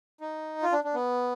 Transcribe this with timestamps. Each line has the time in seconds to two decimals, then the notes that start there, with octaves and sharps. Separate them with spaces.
0.21 D#4
0.62 F4
0.72 D4
0.84 D4
0.94 B3